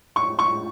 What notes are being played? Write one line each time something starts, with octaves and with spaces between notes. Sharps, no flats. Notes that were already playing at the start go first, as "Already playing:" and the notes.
C#6
C#6